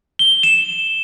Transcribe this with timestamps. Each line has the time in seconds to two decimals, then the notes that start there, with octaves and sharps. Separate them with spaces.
0.19 G7
0.43 E7